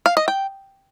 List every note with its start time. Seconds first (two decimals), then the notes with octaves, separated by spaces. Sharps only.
0.06 F5
0.17 D#5
0.28 G5